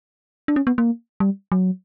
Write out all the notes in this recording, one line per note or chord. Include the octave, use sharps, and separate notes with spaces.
D4
C#4
B3
A#3
G3
F#3